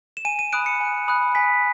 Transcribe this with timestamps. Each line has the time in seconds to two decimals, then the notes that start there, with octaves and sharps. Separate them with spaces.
0.17 E7
0.25 G#5 D#7
0.39 D#7
0.53 B5 D#6 F#6 D7
0.66 C#7
0.80 G#5
1.08 B5 D#6 F#6
1.35 G#5 B6